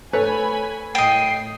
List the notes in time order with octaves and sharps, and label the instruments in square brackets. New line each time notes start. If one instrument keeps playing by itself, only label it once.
[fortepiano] A3 B4 C#5 [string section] G#5 B5
[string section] A2 C7 [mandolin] D#5 G5